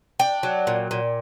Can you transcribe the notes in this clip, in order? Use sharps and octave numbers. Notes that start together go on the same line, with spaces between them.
D4 G5
F#3
A#2
A#2